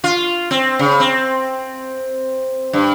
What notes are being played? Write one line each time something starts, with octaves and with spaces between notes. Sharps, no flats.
F4
C4
C#3
C4
G2